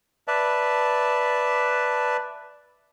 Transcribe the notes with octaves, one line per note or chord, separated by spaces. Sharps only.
B4 D5 E5 A5